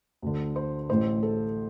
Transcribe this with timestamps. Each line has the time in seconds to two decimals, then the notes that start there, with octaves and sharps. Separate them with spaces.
0.22 D2 D3
0.56 C5
0.89 A1 A2 C5
1.23 A4